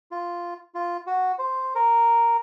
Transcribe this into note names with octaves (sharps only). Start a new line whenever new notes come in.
F4
F4
F#4
C5
A#4